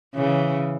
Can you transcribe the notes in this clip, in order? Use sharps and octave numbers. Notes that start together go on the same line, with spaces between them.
C#3 E3